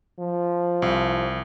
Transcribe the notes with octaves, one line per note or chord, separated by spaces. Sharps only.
F3
C2